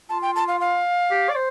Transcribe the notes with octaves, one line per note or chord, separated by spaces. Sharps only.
F4 A5
G5
A5
F5
F5
G4
D5
C5